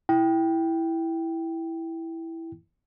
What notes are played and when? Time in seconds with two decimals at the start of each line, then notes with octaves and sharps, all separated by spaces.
0.09 E4 G5